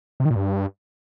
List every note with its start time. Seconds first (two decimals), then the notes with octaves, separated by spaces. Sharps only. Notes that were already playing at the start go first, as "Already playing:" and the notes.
0.20 C3
0.25 D#3
0.30 A#2
0.36 G2